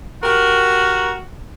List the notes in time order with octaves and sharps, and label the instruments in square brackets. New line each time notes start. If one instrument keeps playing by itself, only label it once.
[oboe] F#4 [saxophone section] G4 A#4